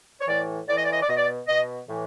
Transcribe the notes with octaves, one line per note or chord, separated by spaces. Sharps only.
C#5
A2 E3 D5
A2 E3 D5
D#5
D5
D#5
D5
B2 D#5
D5
B2 D#5
A2 E3